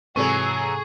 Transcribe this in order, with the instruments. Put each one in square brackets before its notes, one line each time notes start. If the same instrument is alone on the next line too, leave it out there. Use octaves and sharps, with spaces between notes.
[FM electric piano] G#2 C3 A4 [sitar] E3 F#3 [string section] G#4 [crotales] C#6